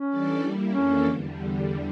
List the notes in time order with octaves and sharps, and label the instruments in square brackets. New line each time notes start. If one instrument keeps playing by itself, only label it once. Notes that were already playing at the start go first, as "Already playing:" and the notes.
Already playing: [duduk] C#4
[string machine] E3 G3 D4 A4 D5
G3 A#3 E4
[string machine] F2 E3 A#3 D4 A4 [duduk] C#4
[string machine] E2 D3 G3